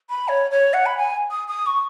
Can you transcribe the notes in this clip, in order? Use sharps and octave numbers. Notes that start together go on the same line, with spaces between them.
B5
C#5
C#5
F#5
B5
G#5
D#6
D#6
C#6